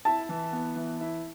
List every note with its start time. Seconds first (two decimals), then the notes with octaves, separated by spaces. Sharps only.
0.05 E4 A5
0.29 E3
0.53 B3
0.76 E3
1.01 E4